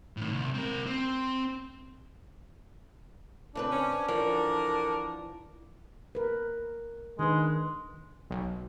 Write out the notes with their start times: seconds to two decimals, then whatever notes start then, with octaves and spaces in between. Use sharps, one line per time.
0.17 A2 D#3
0.31 C2
0.54 C4 A#4
0.86 C4
3.55 C#3 C4 D4 B4
3.70 C#4
4.08 D3 E3 F3 F#4 A#4
6.15 A#4 B4
7.19 D#3 G#3 D4 B4
8.30 B1